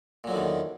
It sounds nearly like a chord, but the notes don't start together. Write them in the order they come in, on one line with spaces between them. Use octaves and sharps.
A#2 F#3 D3 D#3 E2